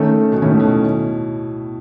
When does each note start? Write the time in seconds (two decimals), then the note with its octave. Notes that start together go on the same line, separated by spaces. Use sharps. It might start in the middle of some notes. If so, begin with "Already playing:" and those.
Already playing: D#3 A3 C#4
0.32 B2
0.42 A2 D#3 A3 C#4
0.60 B2